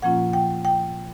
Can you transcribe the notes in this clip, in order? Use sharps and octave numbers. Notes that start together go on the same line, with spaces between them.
A#2 F3 A#3 C#4 F4 F#5
G5
G5